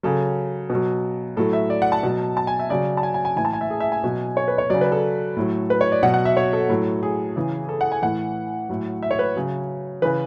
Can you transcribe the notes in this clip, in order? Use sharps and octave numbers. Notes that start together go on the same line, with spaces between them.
C#3 F#3 A4
B2
F#3
A2 F#3 A4
E5
D5
F#5
A5
B2 F#3
A5
G#5
E5
C#3 F#3 D5
A5
G#5
G#5
G#5
A2 E3 G#5
A5
G#5
E5
G#4
E5
G#5
B2 F#3
C#5
B4
C#5
C#3 F#3 D5
B4
A4
A2 F#3
B4
C#5
D5
B2 F#3 F#5
F#5
E5
C#5
A4
A2 F#3
G#4
C#3 E3
A4
F#5
G#5
A2 E3 F#5
A2 F#3
E5
C#5
B4
C#3 F#3
C#3 E3 B4